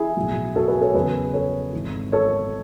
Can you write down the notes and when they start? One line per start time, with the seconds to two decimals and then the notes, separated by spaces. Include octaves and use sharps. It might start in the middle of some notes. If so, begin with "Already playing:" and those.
Already playing: E4 G#4
0.17 B1 A2 F#3
0.55 F#4 A4
0.68 G#4 B4
0.82 A4 C#5
0.94 E2 C#3 F#3 G#4 B4
1.34 A4 C#5
1.73 G#1 G#2 E3
2.12 A4 C#5